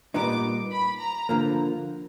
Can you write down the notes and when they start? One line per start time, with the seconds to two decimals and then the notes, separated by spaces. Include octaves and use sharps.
0.14 A#2 G3 B3 D#4 D6
0.72 B5
1.00 A#5
1.29 D3 F3 A#3